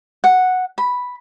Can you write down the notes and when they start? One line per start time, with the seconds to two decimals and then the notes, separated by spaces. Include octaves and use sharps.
0.24 F#5
0.78 B5